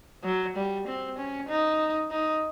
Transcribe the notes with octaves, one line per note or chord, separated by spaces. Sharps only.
F#3
G3
C4
C#4
D#4
D#4